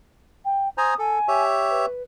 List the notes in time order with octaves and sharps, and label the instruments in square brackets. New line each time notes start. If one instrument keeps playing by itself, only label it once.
[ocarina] G5
[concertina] C5 G#5 A#5 [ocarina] D#6
[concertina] A4 [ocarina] G#5
[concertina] G4 C#5 E5
[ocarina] B4